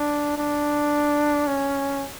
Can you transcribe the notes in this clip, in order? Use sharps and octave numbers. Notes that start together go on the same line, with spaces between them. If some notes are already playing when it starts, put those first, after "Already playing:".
Already playing: D4
D4
C#4